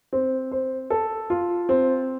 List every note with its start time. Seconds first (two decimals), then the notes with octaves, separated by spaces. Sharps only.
0.13 C4
0.52 C5
0.90 A4
1.30 F4
1.69 C4